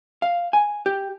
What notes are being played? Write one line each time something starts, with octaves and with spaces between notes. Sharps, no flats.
F5
G#5
G4